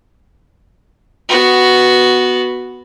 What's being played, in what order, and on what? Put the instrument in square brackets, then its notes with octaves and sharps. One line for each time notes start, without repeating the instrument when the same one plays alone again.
[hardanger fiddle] B3 F#4